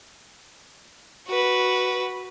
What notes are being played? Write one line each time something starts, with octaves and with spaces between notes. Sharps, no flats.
F#4 B4